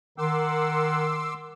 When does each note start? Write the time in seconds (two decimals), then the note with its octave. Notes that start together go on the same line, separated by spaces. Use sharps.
0.18 D#3 A#4 F#5 C6 D6 E6